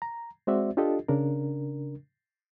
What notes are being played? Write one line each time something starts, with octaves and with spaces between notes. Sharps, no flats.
A#5
G#3 C4 F#4 C5 D5 E5
D4 F4 G4 A4 D#5
C#3 D4 A#4